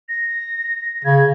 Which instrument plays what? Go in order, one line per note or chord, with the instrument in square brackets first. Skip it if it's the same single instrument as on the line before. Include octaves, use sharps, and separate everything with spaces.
[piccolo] A#6
[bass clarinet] C#3 [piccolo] G#6